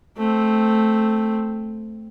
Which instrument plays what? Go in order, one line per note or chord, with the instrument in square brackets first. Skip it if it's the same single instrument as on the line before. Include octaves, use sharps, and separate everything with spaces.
[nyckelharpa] A3 C4